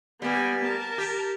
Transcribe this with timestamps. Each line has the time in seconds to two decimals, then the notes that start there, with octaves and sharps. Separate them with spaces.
0.22 G3 A#3 B3 G#5
0.63 A#4 A5
0.98 G4